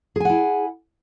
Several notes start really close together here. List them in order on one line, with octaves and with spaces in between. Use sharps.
G#4 G#5 F#5 E4